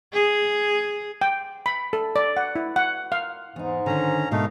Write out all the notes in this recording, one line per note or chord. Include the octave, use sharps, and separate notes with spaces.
G#4
G5
B5
A4
D5
F#5
E4
F#5
F5
E2 G#2 D#4
D3 D#3 C#4 A#5
G#2 B2 A3 D#4 A#4 F5